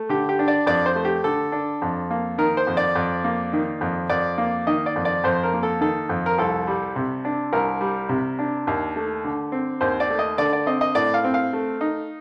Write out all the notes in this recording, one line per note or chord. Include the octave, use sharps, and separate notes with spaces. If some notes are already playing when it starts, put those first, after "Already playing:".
Already playing: A3
D3 G4
G4
D4
D5
F2 D5
C5
A3
G4
D3 A4
D4
F2
A#3
D#3 A#4
C5
F2
D5
F2
A#3
D#3
F2
F2 D5
A#3
D#3 D#5
D5
F2
D5
F2 C5
A#4
A#3
A4
D#3 A4
F2
A#4
C2 A4
G3
C3
D4
C2 A#4
G3
C3
D4
D#2
A3
D3
C4
D#2 C5
D5
A3
D#5
D3 D5
D5
C4 D#5
D#5
A2 D5
F5
C4
F5
A3
D#4